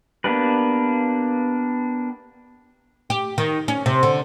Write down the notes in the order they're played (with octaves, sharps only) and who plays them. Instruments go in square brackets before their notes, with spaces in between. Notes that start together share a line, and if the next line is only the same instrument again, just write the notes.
[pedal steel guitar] A#3 B3 D4 G4 B4
[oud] G4
D#3
C#4
C3
D3